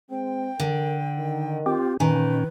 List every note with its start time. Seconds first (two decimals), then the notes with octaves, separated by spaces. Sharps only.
0.10 G#3 C4 G5
0.60 D3 A#4
1.19 D#3
1.66 C4 F4 G4
2.00 F2 A#2 D#3 C#4 B4